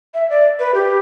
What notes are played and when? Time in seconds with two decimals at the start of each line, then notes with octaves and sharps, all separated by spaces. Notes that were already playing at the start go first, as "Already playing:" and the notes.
0.14 E5
0.30 D5
0.59 B4
0.74 G4